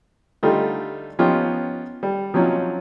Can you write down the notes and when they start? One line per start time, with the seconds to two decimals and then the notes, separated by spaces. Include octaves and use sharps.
0.43 D3 G3 A3 D#4 F4 G4
1.19 F3 B3 C#4 D#4 F4 G4
2.03 G3
2.34 F3 F#3 C4 C#4 D#4 F4